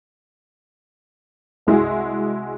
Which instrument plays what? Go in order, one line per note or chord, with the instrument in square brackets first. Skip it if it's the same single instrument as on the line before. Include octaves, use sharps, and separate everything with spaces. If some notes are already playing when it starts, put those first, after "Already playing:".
[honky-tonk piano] C2 G#3 E4 F#4 G#4